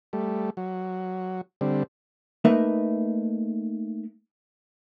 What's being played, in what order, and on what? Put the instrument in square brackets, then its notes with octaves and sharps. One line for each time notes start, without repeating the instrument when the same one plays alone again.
[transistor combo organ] G3 A3
F#3
D3 G3 C4
[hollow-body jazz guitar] A3 A#3 D#4 B4 E5